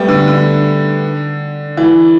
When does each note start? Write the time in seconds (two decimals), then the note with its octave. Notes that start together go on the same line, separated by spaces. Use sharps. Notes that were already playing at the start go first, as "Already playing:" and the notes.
Already playing: G3 A3 B3
0.08 D3
0.28 D3
1.77 E3